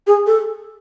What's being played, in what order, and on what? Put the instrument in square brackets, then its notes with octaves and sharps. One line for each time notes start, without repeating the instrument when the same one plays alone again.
[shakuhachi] G#4
A4